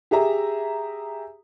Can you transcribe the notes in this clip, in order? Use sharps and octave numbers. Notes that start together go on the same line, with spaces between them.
G4 G#4 E5 A#5